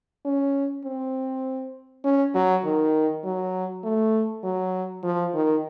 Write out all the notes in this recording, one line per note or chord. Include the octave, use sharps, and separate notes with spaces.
C#4
C4
C#4
F#3
D#3
F#3
A3
F#3
F3
D#3